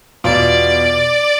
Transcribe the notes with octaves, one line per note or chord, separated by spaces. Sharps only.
E2 B2 B3 F4 D5